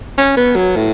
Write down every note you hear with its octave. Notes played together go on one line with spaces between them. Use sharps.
C#4
B3
F#3
A2